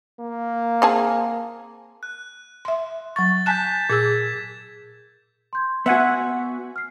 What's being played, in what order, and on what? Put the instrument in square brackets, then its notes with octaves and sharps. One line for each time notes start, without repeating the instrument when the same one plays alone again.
[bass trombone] A#3
[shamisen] C4 G#4 A5
[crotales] F#6
[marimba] E5 C6
[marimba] F#3 C#6 [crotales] A6
[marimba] G#5 A5 F#6 [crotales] G6 B6 E7
[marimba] A#2 G#4 E6 [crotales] G#6
[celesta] C6 G6 G#6
[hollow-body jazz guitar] B3 F#4 [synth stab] E5 F#5 G#5
[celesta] F6 C7